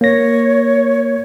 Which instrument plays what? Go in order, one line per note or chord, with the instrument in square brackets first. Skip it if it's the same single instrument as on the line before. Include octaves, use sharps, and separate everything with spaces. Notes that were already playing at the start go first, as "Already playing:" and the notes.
[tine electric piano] A#3 A#6 [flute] C#5